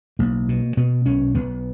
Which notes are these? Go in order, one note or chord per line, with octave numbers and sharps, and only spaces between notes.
B1 A#3
B2
B2 B3
B1 C#4
B1 B3